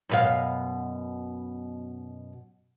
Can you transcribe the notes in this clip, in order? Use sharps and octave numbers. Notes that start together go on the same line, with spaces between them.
F#2 B2 F5